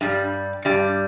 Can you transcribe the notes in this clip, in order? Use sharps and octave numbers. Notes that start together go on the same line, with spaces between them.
G2 G3
G2 G3